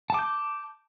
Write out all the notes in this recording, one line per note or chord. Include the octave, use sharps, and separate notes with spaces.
A5 D6 G6